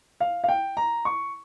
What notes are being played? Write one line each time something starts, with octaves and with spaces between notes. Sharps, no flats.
F5
F5
G5
A#5
C#6